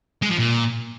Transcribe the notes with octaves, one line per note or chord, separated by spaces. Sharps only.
G#3
F3
A#2